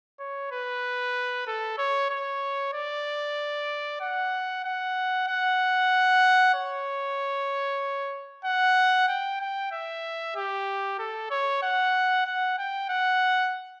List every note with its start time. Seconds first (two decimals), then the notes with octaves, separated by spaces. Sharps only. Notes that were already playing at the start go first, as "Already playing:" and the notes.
0.19 C#5
0.51 B4
1.47 A4
1.78 C#5
2.10 C#5
2.73 D5
4.01 F#5
4.64 F#5
5.27 F#5
6.54 C#5
8.45 F#5
9.08 G5
9.41 G5
9.72 E5
10.36 G4
10.99 A4
11.30 C#5
11.62 F#5
12.25 F#5
12.58 G5
12.89 F#5